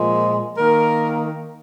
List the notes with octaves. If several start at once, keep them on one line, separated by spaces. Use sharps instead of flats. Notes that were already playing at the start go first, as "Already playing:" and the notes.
Already playing: A#2 F3 G#3
D#3 A#3 A#4